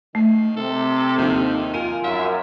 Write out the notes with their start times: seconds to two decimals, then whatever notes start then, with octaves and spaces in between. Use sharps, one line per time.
0.15 D#3 A3
0.56 C3 A4
1.18 D#2 D#3 F3 D#4
1.74 F4 A#4 G#5 D#7
2.04 F#2 E5 F5 C6